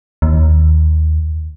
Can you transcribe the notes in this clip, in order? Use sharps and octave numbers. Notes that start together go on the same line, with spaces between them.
D#2